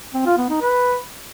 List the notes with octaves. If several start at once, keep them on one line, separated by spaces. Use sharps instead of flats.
C4
F4
B3
D#4
B4